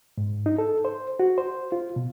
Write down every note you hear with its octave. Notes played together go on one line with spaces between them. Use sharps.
G#2
D#4
A4
C5
F#4
C5
F4
B2